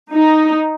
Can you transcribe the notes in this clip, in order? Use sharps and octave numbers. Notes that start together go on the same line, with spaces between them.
D#4